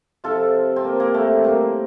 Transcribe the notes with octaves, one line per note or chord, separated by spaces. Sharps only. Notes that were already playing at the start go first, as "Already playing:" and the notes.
C3 F3 F4 A4
C4
A#3
A#3
A3
A2 G3 A#3